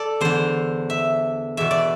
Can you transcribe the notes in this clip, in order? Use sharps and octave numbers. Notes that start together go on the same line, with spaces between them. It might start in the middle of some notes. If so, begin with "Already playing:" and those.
Already playing: A4 D5
E2 D3 C5
E5
E2 B2 E5
D5